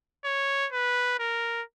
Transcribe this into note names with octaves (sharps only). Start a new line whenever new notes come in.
C#5
B4
A#4